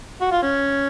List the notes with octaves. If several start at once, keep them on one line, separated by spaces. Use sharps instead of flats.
F#4
F4
C#4